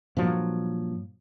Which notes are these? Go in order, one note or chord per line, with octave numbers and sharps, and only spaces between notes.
G2 A#2 F3 F#3